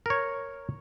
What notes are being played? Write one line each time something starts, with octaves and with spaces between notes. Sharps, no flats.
A#4 C#5